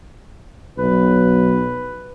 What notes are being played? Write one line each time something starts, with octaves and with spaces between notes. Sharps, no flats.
B1 B4